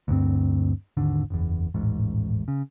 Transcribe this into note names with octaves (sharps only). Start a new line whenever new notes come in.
D2 G2 C4
G#1 D#2 D3
F#1 E2
D#1 A1 G#2
C#3